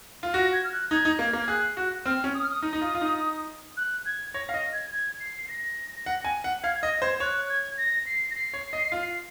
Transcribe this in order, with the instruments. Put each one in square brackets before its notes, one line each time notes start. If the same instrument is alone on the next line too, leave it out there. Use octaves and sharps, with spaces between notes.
[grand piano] F4
[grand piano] F#4 [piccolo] A#6
[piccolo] G#6
F6
F#6
[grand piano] D#4 [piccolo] G#6
[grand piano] D#4
[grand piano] A#3 [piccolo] G#6
[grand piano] A#3
[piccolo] G#6
[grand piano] G#4 [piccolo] F#6
[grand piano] F#4
[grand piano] C4 [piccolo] F6
[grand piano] C#4
[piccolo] D#6
F6
D#6
[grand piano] D#4
D#4
F4
F4
D#4
[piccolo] F#6
G#6
[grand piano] C#5 [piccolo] A#6
[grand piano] F5
[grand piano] D#5 [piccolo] A#6
[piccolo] G#6
G#6
C7
C7
A#6
[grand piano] F#5
G#5
F#5
[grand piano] F5 [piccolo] G#6
[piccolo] G#6
[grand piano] D#5 [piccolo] A#6
[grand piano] C5 [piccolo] G#6
[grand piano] C#5 [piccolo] F#6
[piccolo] G#6
A#6
C7
A#6
C7
[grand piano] C#5
D#5
F4